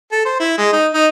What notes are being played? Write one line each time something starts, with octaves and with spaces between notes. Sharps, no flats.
A4
C5
E4
G#3
D#4
D#4